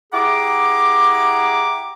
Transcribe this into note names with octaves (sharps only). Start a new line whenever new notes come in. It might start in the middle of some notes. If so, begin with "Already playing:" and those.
E4 G4 G#4 F#5 A#5 D6